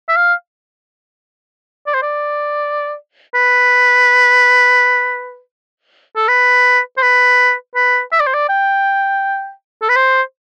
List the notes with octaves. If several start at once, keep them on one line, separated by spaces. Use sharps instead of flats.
E5
F5
D5
C5
D5
B4
A4
B4
C5
B4
B4
E5
D5
C5
D5
G5
A4
B4
C5